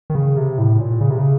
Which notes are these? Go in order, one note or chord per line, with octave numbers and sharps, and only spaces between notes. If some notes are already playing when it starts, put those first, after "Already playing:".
D#3
C#3
C3
A2
A#2
C#3
C3
C#3